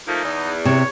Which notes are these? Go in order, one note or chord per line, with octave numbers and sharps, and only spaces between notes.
F3 A3 A#3 D#4
E2
C3 C#5